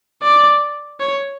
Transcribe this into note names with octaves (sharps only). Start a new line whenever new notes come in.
D5
C#5